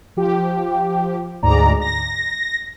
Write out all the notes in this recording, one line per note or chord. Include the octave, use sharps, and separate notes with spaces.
F3 G4
D2 G#2 G#3 D5 A#5
A#6